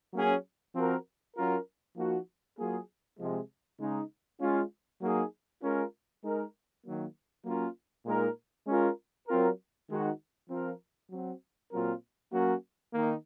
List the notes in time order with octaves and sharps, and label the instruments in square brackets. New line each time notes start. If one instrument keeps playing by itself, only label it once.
[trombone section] F#3 A#3 C#4 G#4
F3 C4 F#4 A#4
F#3 C#4 F4 A#4
F3 A#3 D#4 F#4
F#3 A#3 F4 G#4
C3 F3 G#3
C#3 G#3 D#4
G#3 C#4 F4
F#3 A#3 D#4 G#4
G#3 C#4 F4 A#4
G#3 D#4 A#4
D#3 F#3 A#3
F#3 A#3 C#4 F4 A#4
A#2 G#3 D#4 A#4
G#3 C#4 F4 A#4
F#3 C4 F4 A#4
D#3 G#3 D#4 F#4
F3 C4 F4 A#4
F#3 C4 F#4
A#2 F#3 C4 F4 A#4
F#3 A#3 C#4 F#4 A#4
D#3 A#3 D#4